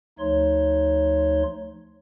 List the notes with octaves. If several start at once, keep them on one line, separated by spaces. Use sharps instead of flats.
D2 F3 A3 D#4 C#5 C6